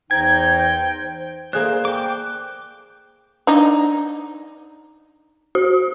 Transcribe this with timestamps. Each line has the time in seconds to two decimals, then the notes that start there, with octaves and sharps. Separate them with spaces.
0.11 E2 E3 D#4 C5 G5 G#6
1.53 A#3 G#4 C5 D5 F#6
1.85 G5 D6
3.47 D4 D#4
5.55 F#4